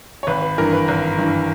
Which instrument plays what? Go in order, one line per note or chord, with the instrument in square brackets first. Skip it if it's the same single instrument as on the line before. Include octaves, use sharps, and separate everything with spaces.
[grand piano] C#5
G#1 B4
B4
G2 E3 A#4
B4
G#1 B4
G2 E3